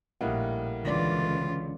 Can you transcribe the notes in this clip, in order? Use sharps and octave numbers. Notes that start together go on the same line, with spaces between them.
A#1 A2 G3 A#3 D#5 F#5
C#2 D3 E3 F4 D5